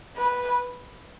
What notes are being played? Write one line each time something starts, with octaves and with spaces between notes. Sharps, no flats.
B4